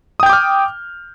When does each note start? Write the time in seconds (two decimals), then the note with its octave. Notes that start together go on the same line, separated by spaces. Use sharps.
0.20 D#6
0.23 G5
0.26 G6
0.30 D6
0.33 F6